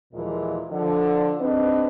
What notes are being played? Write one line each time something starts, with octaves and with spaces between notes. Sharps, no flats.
D#2 A#2 E3 F3 G#3 A#4
D3 F3
C4 D4 D#4 G#4 B4